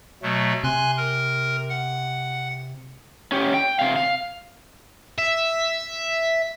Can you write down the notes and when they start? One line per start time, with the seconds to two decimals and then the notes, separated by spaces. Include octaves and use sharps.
0.23 B2 F#3 A3
0.64 C3 G#5 C6 F#6
0.97 A#4
1.70 F#5
3.32 C#4 G4
3.54 G5
3.79 C3 F5
3.96 F5
5.18 E5